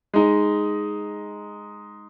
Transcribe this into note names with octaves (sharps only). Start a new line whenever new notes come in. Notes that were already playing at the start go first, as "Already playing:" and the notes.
G#3 D#4